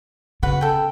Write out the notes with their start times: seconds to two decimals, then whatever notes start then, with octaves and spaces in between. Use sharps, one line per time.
0.43 C#3 F#4 B4 F#5
0.61 A4 G5